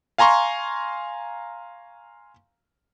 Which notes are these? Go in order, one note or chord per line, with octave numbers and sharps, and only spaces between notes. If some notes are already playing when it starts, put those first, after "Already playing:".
F5 G#5 A#5 C6 C#6